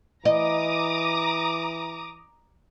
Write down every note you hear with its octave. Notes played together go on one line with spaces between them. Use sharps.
E3 D#5 A#5 D6 D#6